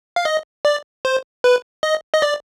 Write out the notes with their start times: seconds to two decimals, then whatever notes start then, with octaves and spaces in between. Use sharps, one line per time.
0.16 F5
0.25 D#5
0.65 D5
1.05 C5
1.44 B4
1.83 D#5
2.14 D#5
2.22 D5